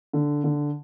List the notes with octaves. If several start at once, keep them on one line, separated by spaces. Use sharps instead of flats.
D3
D3